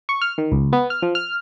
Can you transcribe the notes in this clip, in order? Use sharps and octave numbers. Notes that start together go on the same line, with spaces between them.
C#6
F6
D#3
C#2
B3
F6
F3
F6